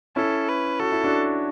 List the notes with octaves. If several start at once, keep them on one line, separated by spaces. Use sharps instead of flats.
C#4 E4 A4
B4
F#4 A4
E4
D4 F#4